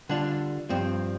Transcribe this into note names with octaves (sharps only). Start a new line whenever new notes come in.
D3 G3 D4 F4
G2 F3 C4